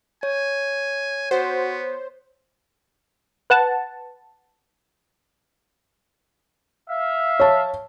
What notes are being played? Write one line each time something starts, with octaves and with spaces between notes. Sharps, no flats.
C#5 G#5
B3 F#4 C5
B4 F#5 A5
E5 F5
C#5 A5